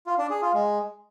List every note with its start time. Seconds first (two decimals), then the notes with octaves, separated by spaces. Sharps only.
0.07 F4
0.18 D4
0.30 G#4
0.42 F4
0.54 G#3